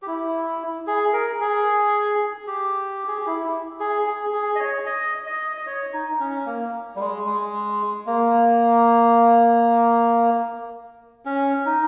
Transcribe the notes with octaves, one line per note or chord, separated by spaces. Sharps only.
G4
E4
G#4
A#4
G#4
G4
G#4
G4
E4
G#4
G#4
G#4
D#5
C#5
D#5
D#5
D#5
C#5
D#4
C#4
A#3
G3
G#3
G#3
A#3
C#4
D#4